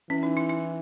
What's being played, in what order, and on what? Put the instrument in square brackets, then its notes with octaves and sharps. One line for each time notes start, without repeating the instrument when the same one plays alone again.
[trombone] E3 [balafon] C#4
[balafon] D#4
E4
E4